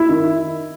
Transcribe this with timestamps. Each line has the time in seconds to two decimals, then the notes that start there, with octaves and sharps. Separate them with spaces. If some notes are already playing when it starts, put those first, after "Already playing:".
Already playing: E4 E5
0.09 D#3